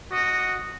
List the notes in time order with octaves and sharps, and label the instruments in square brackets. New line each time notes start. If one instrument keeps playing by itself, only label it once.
[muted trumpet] F#4 [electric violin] D#5